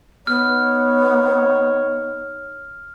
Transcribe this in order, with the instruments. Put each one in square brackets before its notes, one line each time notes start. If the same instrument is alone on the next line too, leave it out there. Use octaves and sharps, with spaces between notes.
[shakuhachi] B3 [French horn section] D#4 C#5 [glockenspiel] F6